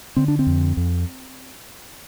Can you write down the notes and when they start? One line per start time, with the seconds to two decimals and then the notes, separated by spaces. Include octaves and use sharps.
0.17 D3 C4
0.28 D4
0.39 C4
0.47 F2
0.77 F2